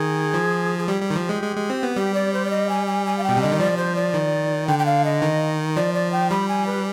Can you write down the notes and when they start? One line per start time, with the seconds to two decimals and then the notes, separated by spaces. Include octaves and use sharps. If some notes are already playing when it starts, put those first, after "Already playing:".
Already playing: D#3 G#4
0.34 F3
0.79 G#4
0.88 G3 G4
1.02 G3
1.10 D#3
1.15 F3
1.29 G#3
1.42 G#3
1.56 G#3
1.70 C4
1.83 B3
1.96 G3 G4
2.14 D5
2.33 C5
2.45 D5
2.50 D#5
2.69 G#5
2.87 G#5
3.06 G#5
3.18 F5
3.23 G5
3.29 B2
3.37 C3
3.42 D3 D#5
3.52 D#3
3.59 F3 D5
3.77 C5
3.96 D5
4.14 D#3
4.67 D3 G5
4.79 G5
4.86 F5
5.05 D#5
5.22 D#3
5.76 F3 D5
5.94 D5
6.12 G5
6.30 G3 B5
6.48 G#5
6.66 B4